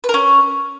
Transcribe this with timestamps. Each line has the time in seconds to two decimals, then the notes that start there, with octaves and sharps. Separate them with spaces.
0.04 B4
0.09 A#4
0.14 C#4